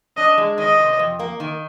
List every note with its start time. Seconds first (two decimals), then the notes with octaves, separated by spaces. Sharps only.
0.17 D4 D#5
0.38 G#3
0.58 D#3 D#5
0.79 C3
0.99 F2
1.19 A#3
1.40 D#3